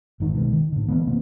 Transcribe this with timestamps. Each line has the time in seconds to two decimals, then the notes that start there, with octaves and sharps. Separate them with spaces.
0.20 G1 G#2 D#3
0.34 B2 D#3 F#3 G#3
0.53 D#3
0.72 A2 D3
0.88 E3 F3 A3 B3
1.07 C3 A#3 C4